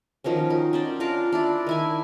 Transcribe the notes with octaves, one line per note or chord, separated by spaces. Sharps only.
D#3 F3 F#3 C#4
D#4
C#4 C5 D5
D4 F4 A#4 F5
D4 E4 D5
D#3 E4 G#5